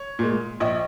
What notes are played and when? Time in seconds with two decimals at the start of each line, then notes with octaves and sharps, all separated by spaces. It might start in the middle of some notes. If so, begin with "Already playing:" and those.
Already playing: C#5
0.19 A#2 G#3
0.60 A#1 D#5